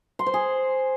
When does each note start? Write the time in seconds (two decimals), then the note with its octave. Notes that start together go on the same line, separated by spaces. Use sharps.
0.19 C6
0.26 C5
0.34 G#4